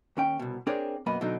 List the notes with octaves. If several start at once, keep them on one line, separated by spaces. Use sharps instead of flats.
D#2 C#4 G5
C2 B2
C4 D4 G#4 A#4 C#5 D5
B1 F#2 A#3 B3 D#5 B5
B2 D3 F#3 C4 D#4